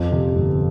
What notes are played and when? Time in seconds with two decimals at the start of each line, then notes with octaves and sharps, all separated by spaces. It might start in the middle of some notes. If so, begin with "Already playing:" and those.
Already playing: F2
0.12 C3
0.36 G1